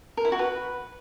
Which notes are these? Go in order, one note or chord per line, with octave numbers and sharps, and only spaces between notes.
A#4
E4
F#4
B4